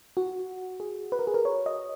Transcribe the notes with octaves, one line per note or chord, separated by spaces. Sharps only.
F#4
G#4
B4
A#4
G#4
A#4
C#5
D#5